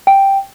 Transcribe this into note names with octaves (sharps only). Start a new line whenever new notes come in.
G5